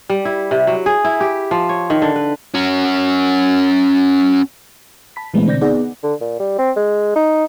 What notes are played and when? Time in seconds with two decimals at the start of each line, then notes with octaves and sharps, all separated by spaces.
0.10 G3
0.25 E4
0.51 C3
0.67 F#3
0.86 G#4
1.05 E4
1.20 G4
1.51 F3
1.69 C#5
1.90 D#3
2.02 D3
2.16 B4
2.54 C#4 F#4
5.16 A5 B5 B6
5.34 A#2 E3 G#3 A3 B3 C4
5.46 B2 D3 C4 D5 G6 A#6
5.61 B3 D#4 G#4 B4 D5 F#5
6.03 D3
6.21 A#2
6.40 G3
6.58 C4
6.76 G#3
7.16 D#4